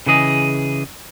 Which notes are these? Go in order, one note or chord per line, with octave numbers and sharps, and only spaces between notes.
C#3 E3 G#4 D#5